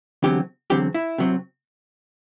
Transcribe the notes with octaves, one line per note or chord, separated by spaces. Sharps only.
E2 D3 F#3 C4 G4
E2 D3 F#3 C4 G4
E4
C3 F#3 C4